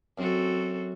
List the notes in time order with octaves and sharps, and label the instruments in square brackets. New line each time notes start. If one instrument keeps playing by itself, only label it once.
[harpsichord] F#2 [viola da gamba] C4 F#4 A4